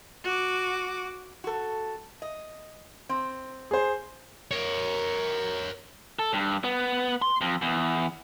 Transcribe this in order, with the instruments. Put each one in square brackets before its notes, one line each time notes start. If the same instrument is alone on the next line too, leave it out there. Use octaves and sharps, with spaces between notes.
[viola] F#4 D6
[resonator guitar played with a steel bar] F#4 A4
D#5
C4
[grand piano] G#4 C5
[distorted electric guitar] A#4 C#5
[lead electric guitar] A4
G2
B3
C6
F2
E2